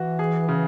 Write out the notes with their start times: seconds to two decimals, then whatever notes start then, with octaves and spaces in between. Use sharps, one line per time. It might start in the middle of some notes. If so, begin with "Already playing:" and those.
Already playing: E3 F#4
0.19 G#4
0.49 C#3